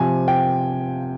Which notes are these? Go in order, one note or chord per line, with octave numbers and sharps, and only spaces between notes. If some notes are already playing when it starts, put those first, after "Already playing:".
Already playing: C3 F3 G#5
G5